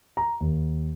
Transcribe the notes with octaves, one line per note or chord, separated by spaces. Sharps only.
A#5
D#2